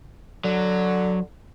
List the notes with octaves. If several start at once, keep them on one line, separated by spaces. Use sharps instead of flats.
D3 F#3